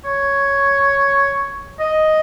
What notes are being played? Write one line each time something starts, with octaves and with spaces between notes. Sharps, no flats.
C#5
D#5